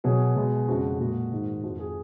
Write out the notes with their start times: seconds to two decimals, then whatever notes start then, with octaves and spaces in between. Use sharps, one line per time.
0.04 B2 F#3 G#4
0.36 B2 G#3
0.67 F2 C#3 G#3 F#4
0.99 A#2 G#3 F#4
1.32 G#2 D#3 G#3
1.63 F2 F3 G#3 F#4
1.79 G#4